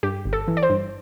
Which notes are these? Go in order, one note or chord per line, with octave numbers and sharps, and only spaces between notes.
G2 G4
G1
A4
E3
D5
C5
G2